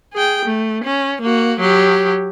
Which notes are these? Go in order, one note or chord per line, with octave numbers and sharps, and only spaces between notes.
G#4 G5
A3
C#4
A#3 F#4
F#3 G4